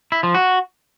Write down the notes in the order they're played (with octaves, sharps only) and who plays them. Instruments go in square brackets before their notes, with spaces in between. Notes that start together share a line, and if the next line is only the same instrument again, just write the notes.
[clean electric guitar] E4
F3
F#4